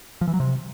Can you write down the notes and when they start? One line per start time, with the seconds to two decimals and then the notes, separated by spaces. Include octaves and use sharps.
0.21 F3
0.27 E3
0.34 F#3
0.40 C3